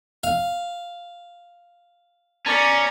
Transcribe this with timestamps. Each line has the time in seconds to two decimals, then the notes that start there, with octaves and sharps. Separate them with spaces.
0.23 F5
2.46 C#4 D5 A#5 A6 B6 C#7